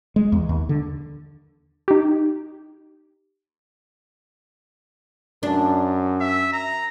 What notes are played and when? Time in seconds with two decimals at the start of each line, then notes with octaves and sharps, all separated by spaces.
0.16 G#3
0.32 E2
0.49 D#2
0.69 D3
1.88 D#4 G4
5.43 F#2 D4
6.21 E5
6.53 A#5